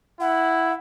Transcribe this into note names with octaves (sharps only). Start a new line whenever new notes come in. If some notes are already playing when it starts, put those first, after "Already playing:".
E4 F#5